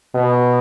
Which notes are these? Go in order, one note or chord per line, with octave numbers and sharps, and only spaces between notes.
B2